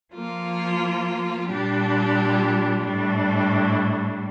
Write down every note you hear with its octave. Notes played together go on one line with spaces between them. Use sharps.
F3 A#3 F4
A#2 G3 D4 G4
A2 G3 D4